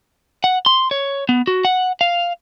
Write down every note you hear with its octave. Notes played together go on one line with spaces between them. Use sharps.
F#5
C6
C#5
B3
F#4
F#5
F5